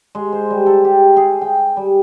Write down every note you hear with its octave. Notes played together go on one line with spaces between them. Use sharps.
G#3
C5
G3
A4
G4
G#4
G5
G3